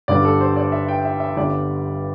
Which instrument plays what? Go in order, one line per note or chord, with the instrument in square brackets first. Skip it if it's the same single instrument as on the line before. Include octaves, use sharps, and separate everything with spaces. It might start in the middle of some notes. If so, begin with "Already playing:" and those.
[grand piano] G1 G2 D3 G3 D5
A4
C5
D5
E5
G5
E5
E5
G1 G2 D3 G3 D5